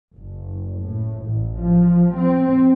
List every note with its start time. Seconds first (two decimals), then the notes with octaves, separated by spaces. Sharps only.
0.15 F#1
0.80 A2
1.22 A1
1.58 F3
2.16 C4